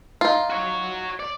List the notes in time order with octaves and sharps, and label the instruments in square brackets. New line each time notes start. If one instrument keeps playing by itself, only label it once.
[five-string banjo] D#4 F4
[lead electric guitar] F#4 C#5
D5